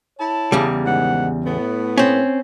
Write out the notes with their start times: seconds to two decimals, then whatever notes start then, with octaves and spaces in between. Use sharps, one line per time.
0.19 E4 C#5 A5
0.52 E2 C#3 G3
0.86 G#2 D#3 F#5
1.45 A2 B3
1.98 C4 C#4